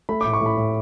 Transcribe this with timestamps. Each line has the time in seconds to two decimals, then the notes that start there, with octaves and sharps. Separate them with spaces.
0.09 A3 B5
0.21 A2 D6
0.33 C#6
0.41 A2 B5
0.57 A2